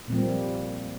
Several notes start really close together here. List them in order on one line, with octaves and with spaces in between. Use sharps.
A#2 C4 F3 A#3 G3